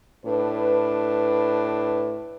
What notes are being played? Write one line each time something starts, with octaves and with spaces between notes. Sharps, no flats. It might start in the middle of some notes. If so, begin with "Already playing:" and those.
A2 D4 B4